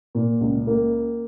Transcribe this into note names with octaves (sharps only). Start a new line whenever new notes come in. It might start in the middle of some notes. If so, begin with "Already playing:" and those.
A#2
C#2
A#3